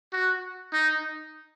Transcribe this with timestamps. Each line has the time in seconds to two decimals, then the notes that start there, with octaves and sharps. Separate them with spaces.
0.13 F#4
0.73 D#4